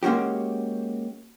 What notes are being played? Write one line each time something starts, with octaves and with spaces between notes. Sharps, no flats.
G#3 A#3 C#4 F#4 G4